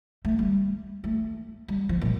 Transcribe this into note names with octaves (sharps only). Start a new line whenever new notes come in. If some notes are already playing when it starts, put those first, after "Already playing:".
A3
G3
A3
G3
F3
A#2